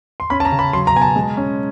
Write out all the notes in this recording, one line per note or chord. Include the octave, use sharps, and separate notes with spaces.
C6
C#4 B5
A5
A#5
C#3
B5
F#3 C6
A#5
B2 G#5
A5
G#3
C#4